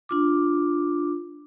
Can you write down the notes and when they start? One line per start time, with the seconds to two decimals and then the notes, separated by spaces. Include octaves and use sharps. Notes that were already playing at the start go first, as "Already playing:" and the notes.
0.09 D4 F4 D6